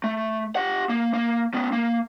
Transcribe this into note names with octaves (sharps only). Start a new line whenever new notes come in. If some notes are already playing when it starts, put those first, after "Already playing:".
A3
G4 F#5
A#3
A#3
B3 C#4
A#3